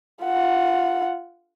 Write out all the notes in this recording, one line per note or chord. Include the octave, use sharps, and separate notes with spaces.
F4 F#5